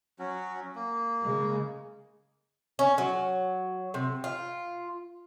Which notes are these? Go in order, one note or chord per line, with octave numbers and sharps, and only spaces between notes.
F#3 C#4 F#4
A#3
C#3 G#3
C#4
F#3
C3
F4